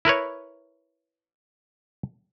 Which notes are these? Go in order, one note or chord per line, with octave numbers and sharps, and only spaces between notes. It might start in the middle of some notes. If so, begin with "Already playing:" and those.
E4 A#4 B4 C#5